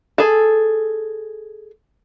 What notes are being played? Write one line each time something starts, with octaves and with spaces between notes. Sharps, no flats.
G#4 A4